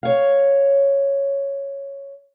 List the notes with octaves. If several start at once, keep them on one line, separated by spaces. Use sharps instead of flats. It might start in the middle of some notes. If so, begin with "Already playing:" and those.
C#5 F5